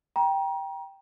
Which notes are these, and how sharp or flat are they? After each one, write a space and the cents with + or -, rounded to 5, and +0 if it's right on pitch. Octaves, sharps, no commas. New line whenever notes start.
G5 +0 A#5 +30